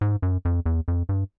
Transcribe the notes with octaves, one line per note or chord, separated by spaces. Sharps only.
G#2
F#2
F2
E2
F2
G2